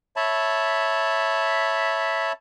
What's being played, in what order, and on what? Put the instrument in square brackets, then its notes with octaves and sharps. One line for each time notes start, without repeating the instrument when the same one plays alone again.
[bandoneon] C#5 E5 A5 B5